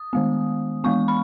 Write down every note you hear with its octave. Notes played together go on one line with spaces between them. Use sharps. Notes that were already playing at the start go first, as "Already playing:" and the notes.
Already playing: D#6
D#3 G#3 B3
E3 G#3 B3 C#6
B5